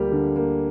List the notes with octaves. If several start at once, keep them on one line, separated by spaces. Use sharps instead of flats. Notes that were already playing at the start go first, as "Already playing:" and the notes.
Already playing: D2 G3 A#3 F4 G4
D3
A#3